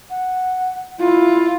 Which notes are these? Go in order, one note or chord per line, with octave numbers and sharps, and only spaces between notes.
F#5
E4 F4